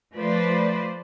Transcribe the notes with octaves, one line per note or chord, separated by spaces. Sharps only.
F3 A3 B4 C5 D5